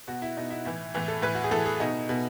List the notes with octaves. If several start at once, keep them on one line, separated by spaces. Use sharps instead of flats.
B2 F#4
E4
B2 D#4
E4
A2 E3 E4
A2 E3 E4
A4
A2 E3 B4
F#4
G#4
A2 E3 A4
G#4
B2 D#4
B2